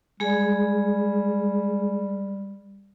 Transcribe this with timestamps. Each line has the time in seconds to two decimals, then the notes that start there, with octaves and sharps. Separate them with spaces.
0.20 G3 G#3 G#4